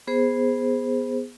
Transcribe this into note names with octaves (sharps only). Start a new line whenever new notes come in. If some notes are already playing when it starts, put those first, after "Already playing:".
B3 G#4 C5